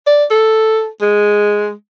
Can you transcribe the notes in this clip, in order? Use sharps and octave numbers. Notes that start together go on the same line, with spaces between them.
D5
A4
G#3